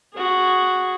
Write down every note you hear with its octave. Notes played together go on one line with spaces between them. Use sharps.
F#4 G#4